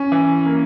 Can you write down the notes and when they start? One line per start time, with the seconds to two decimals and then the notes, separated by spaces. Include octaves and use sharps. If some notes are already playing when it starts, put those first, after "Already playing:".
Already playing: C#4
0.12 E3
0.46 A#3